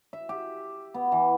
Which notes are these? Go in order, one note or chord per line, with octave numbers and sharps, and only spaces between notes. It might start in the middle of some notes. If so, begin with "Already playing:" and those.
E5
G4
B3
E3